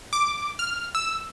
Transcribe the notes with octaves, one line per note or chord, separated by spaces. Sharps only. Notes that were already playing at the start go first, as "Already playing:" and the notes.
D6
F6
E6